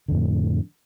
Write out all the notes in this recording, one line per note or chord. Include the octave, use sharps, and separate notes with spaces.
F2 A2 D3